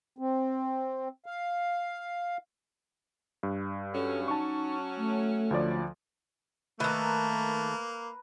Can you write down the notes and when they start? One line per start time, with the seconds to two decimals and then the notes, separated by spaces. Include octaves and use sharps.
0.18 C4
1.26 F5
3.43 G2
3.94 F#3 C#4 A4
4.28 D#4 A5 C#6
4.97 A3
5.51 D2 F3 D5
6.80 D#3 A3 A#3 A4 B4 A#5